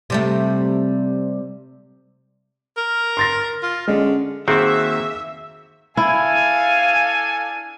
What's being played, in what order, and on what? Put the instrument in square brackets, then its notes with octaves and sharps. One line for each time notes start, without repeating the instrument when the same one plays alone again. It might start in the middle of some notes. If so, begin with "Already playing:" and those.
[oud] C3 G3 A3
[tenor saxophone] A#4
[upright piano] C6 A6 A#6
[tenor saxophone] F4
[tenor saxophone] D3 [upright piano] G#3 C#4
[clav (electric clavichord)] D#3 C4 [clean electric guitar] A#3 F#4 [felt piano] G#4 [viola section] E5
[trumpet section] D4 A4 G#5 [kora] E4 [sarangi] F5